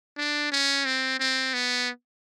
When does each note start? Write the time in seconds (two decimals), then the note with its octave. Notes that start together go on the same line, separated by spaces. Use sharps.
0.18 D4
0.52 C#4
0.86 C4
1.20 C4
1.54 B3